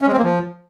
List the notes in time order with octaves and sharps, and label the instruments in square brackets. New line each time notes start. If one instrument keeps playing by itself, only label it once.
[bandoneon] C#4
G#3
C4
A#3
F3